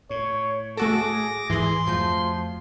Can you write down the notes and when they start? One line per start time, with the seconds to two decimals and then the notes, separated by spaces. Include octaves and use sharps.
0.10 A2 C#5
0.77 A3 F#4 G#4 A4 D6 A#6
1.50 G#2 E3 G#4 C6
1.87 F2 F3 F#3 A3 G6